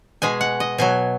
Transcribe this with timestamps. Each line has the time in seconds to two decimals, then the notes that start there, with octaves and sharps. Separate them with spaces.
0.22 B2 G#3 G#5
0.41 F#5
0.60 D#5
0.78 B2 F#3 G#5